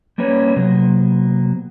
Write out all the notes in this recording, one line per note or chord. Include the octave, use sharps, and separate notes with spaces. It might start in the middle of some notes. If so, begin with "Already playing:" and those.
G3 A#3 C#4 B4 C#5
C3 F#3 A#3 B3